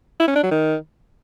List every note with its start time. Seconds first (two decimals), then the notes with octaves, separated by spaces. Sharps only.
0.20 E4
0.28 C#4
0.35 D4
0.43 F#3
0.51 D#3